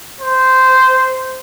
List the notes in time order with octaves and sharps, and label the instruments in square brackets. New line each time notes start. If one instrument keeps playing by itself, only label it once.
[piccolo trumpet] C5